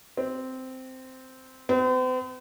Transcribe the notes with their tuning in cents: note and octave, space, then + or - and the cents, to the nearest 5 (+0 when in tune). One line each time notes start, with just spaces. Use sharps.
C4 -10
C4 -45